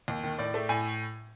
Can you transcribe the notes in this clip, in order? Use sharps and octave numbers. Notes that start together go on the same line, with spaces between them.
D#2
D#3
A2 D5
A3
A2 G#5